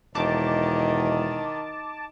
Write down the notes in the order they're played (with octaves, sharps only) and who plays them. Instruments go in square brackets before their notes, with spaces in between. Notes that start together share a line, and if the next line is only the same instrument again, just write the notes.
[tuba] E1 [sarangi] D#3 [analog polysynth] A5 D6